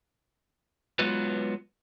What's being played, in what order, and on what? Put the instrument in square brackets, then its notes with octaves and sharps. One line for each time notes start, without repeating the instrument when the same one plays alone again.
[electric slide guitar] F#3 G#3 B3 F4 B4